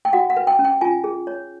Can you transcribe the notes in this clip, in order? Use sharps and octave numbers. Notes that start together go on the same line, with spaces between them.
G5
F#4 F#5
F#5
B4
G5
C#4
G5
F4 G#5
G#4
C#5